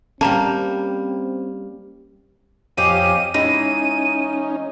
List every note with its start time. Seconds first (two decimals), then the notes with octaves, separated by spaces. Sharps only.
0.21 G3 A#3 C4 C#4 A5 A#5
2.78 F2 C4 C#4 G4 D#5 F5 D#7
3.34 E3 G#3 C#4 D#4 D#7